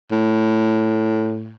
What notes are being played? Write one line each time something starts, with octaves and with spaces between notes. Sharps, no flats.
A2